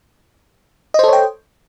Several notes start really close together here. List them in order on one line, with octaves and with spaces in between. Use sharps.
D#5 C5 A4 C#5 G5